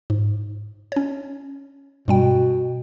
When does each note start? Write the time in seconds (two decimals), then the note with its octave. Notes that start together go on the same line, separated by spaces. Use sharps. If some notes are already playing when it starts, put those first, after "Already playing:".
0.10 G#2
0.92 C#4 C#5
2.08 G2 B2 G3 G5